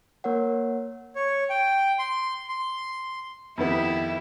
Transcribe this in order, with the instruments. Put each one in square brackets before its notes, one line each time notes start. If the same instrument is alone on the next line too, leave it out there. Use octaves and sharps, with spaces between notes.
[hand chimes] A#3 A#4 C#5 F#5
[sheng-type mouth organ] C#5
G5
C6
C6
[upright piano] F2 D#3 B3 [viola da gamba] E4 G4